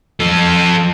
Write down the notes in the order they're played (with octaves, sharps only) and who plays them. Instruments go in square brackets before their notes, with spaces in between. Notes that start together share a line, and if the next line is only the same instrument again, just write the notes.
[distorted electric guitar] F3 A4